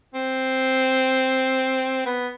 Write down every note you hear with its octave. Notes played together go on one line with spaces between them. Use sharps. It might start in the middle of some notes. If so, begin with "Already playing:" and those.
C4
B3